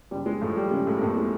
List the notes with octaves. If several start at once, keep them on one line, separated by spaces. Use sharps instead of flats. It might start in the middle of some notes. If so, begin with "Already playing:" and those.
F#1 G3
G#3
A2 F3 A3
G3
C#3 G#3
A2 A3
A#3
F2 A2 A3
G#3